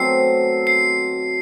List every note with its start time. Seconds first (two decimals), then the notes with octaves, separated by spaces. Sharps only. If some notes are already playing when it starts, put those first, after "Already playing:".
Already playing: B2 F#3 A3 C4 C7
0.67 C7